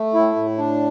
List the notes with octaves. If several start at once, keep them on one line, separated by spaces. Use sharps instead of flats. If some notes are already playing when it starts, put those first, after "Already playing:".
Already playing: A3
A2 E4
A2
D4